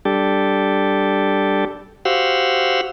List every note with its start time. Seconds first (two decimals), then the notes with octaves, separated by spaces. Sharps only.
0.05 G3 D4 G4 A4
2.05 F#4 G4 C5 F5 F#5 E6